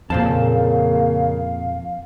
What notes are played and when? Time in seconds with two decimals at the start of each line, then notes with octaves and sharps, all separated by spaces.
0.10 F2 A#2 C#3 A#3 C5 F5 A5